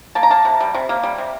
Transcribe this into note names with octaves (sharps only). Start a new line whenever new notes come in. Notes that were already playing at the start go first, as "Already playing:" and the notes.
A#3 A5
A#5
A#3 A5
C3
G3
C3
A#3
G3
C3